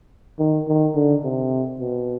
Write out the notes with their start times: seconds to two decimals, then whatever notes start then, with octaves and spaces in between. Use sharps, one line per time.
0.39 D#3
0.68 D#3
0.95 D3
1.24 C3
1.80 B2